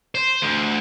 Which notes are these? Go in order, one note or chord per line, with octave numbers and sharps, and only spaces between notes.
C5
D2